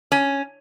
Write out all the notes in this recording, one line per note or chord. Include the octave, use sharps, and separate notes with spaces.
C#4